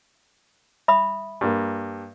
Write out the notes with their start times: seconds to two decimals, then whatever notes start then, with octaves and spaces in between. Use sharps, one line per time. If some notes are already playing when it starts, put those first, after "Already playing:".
0.88 E5 B5 D#6
1.41 G2 A#3